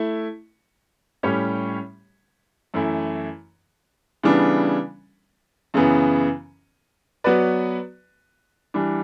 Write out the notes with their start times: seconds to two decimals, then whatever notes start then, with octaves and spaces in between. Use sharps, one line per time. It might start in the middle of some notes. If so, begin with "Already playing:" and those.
Already playing: A3 E4
1.23 A2 G3 C#4 G4 C#5
2.74 F#2 E3 A3 E4
4.23 C#3 E3 G3 B3 D4
5.74 F#2 C#3 E3 B3
7.24 F#3 B3 F#4 B4 D5
8.74 E3 G3 D4